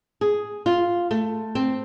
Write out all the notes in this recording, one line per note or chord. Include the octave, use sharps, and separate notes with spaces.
G#4
F4
A3
C4